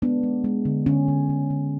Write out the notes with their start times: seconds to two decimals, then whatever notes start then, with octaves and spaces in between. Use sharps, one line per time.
0.02 G#3 B3 D4
0.23 G#3
0.44 G#3
0.65 D3
0.86 D3 C#4
1.08 D3
1.29 D3
1.50 D3